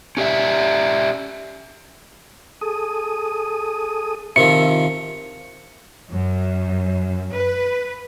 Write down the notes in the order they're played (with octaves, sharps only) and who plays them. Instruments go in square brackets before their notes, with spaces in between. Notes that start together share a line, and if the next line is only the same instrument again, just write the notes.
[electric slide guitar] C#4 G4 D5 E5
[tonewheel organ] G#4 A4 D#6
[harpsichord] C3 D#3 F3 [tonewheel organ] F4 E5 [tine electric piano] C#7
[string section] F#2
B4